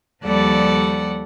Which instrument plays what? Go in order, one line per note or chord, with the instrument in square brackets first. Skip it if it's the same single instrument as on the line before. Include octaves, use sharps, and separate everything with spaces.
[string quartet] D#2 F3 G3 A4 D5 F#5